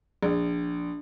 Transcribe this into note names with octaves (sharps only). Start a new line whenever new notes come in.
A#1